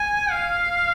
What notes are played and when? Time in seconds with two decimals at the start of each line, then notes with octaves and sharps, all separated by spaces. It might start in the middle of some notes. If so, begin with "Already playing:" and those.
Already playing: G#5
0.31 F5